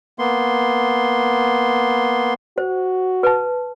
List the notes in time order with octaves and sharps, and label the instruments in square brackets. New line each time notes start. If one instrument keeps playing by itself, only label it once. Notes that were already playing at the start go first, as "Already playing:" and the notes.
[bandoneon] A#3 B3 C6
[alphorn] F#4 [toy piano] C5
[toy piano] B4 A5